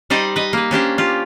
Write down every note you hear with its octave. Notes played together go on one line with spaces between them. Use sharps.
G3 D#4 C5 D5 D#5
B4 D#5
A#3 B4
C#4 D4 G4 C5
F4 G4